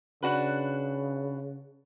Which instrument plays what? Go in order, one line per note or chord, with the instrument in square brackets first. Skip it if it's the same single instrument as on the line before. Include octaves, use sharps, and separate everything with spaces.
[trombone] C#3 [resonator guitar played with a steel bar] D4 F#4 B4